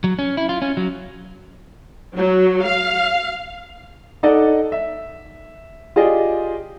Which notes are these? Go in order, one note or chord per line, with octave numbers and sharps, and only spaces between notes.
F#3
C#4
E4
F4
C#4
F#3
F#3
F5
D#4 A4 D5 D#5 F#5
E5
F4 G4 G#4 D5 D#5